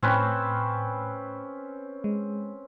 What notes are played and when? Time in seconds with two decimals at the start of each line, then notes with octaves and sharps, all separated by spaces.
0.03 A2 C4 C#4 B4
2.04 G#3